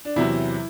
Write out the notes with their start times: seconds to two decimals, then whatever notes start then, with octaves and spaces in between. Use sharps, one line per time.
0.05 D4
0.16 E2 C3 F#3 E4